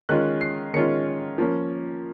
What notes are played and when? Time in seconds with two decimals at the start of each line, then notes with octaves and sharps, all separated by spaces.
0.09 D#3 G#3 C#4 F4 F#6
0.41 C7
0.74 D#3 G#3 C#4 F4 C#7
1.38 F3 A#3 C#4